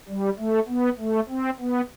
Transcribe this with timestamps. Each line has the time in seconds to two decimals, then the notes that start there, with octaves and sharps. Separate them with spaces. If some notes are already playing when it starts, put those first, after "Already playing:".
0.08 G3
0.38 A3
0.68 B3
0.99 A3
1.29 C4
1.60 B3